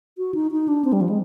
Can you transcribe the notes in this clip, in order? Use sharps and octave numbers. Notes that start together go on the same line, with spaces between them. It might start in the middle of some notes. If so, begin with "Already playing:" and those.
F#4
D#4
D#4
D4
C4
G3
F3
G#3